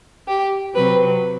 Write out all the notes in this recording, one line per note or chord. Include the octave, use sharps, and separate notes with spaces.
G4
C3 F#3 C4 B4